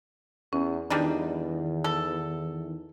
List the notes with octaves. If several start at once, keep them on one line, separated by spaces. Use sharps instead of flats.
E2 C#4
E2 D#3 E3 G3 D4 D#4
A4